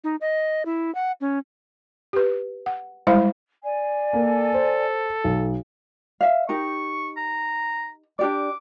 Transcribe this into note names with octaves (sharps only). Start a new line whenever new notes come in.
D#4
D#5
E4
F#5
C#4
G4 B4
F#5
G3 G#3 E4 C5 F5 B5
D5 G#5
A#3 A4
C5
B1
E5 F5
D#4 G4 A#4 C#6
A#5
D4 G4 D5 D6